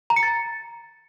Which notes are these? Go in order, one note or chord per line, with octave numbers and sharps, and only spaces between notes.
A#5
C#7
A6